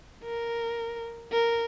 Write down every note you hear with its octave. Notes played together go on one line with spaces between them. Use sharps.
A#4
A#4